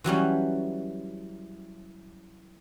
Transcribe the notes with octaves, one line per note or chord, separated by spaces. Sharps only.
E3 F#3 G3 C#4